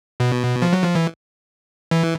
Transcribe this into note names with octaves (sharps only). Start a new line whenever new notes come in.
B2
F3
F#3
F3
E3
E3